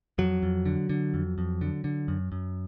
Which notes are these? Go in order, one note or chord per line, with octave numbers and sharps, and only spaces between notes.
F2 F#3
F2
D3
D3
F2
F2
D3
D3
F#2
F#2